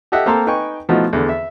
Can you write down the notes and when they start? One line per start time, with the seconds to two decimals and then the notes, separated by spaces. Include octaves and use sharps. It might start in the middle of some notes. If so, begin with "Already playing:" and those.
0.12 G4 A4 D#5 E5 F#5
0.26 A#3 C4 A4 A#5 C6
0.47 D#4 B4 G5 G#5 C#6
0.89 B2 F3 A3 D#4 E4 F#4
1.13 E2 D3
1.29 E5